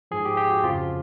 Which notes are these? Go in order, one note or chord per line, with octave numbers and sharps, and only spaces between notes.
G#2 F3 G#4
G4
G4
F#4
F2 C#3 F3 F4